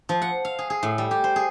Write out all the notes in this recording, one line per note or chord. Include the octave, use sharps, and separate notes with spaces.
F3
F#5
F5
G#4
G#4
A2
G3
G4
C5
G#4